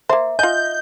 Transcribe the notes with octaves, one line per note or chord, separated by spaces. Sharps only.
A#3 C5 E5
F4 D#5 G#5 G6